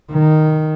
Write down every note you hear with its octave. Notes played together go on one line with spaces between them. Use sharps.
D#3